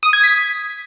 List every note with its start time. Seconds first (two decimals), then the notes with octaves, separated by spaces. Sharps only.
0.03 D#6
0.13 G#6
0.23 B6